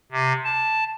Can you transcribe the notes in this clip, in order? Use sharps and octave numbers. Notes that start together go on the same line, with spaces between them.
C3
A5